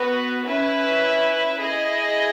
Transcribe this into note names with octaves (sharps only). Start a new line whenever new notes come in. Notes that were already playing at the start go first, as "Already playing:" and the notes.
Already playing: B3 F#4 B4
C#4 E4 B4 E5
E4 G#4 D#5